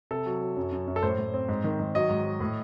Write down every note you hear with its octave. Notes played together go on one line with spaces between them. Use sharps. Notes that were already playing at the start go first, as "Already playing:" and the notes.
C3 A4
F#3
F#3
F#2
F#2
F#2
A4
A2 C5
A2
C4
G#2
D#3
D#3
F#3 D#5
G#2
F#3
A2